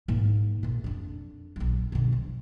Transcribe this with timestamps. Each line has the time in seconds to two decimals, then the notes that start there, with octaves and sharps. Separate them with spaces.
0.08 G#2 A#3
0.63 A#1 A#2
0.84 F2 D4
1.56 A#1 F#3
1.92 B2 D3
2.12 F3